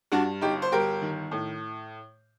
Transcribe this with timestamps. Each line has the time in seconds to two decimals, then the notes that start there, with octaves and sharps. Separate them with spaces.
0.12 G2 D4 F#4
0.41 G1 D#4 G4
0.62 C5
0.72 G1 G4 A#4
1.02 D#3
1.31 A2